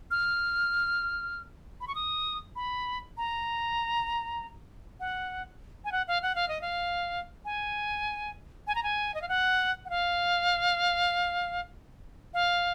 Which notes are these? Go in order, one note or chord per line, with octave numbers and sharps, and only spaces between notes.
F6
B5
C#6
D#6
B5
A#5
F#5
G#5
F#5
F5
F#5
F5
D#5
F5
G#5
G#5
A#5
G#5
D#5
F5
F#5
F#5
F5
F5